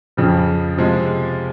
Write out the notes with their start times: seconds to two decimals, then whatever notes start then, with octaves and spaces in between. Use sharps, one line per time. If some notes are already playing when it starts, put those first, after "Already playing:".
0.17 F2 C#3 F3
0.78 C3 F3 G#3